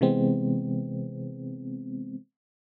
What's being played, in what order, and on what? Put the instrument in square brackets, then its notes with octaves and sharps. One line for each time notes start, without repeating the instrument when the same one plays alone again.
[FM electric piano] C3 E3 G#3 B3 C4